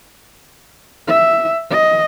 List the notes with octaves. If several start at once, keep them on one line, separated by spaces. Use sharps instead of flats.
E5
D#5